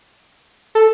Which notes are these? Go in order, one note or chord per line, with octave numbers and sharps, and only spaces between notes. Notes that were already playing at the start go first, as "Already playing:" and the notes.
A4